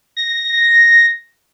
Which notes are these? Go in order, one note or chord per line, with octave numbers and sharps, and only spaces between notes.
A#6